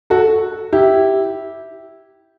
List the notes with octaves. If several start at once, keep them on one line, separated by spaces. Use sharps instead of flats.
F#4 A4
E4 G4